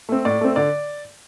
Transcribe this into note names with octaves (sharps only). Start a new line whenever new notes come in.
A3 C4
A2 D5
A3 C4
D3 D5